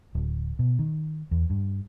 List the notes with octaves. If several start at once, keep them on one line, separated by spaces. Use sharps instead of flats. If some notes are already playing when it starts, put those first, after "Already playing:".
D1
B2
D#3
E2
G2